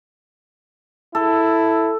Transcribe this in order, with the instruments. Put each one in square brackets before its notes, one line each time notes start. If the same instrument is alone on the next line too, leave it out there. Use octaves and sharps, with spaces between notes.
[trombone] E4 [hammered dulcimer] A4